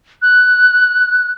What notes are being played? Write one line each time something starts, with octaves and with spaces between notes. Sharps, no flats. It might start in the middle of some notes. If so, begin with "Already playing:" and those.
F#6